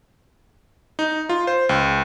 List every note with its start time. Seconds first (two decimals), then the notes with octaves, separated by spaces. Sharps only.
0.99 D#4
1.29 F4
1.47 C5
1.69 C#2